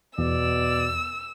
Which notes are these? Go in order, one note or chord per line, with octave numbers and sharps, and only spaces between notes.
E2 B2 D5 E6